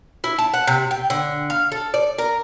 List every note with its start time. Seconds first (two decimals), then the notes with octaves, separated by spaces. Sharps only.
0.24 E4
0.38 A5
0.54 F#5
0.67 C3
0.91 G5
1.10 D3
1.50 F5
1.72 A4
1.94 D5
2.18 A#4